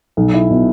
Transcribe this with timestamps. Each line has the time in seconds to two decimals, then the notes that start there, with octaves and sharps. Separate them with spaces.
0.17 B1
0.34 E4
0.50 B2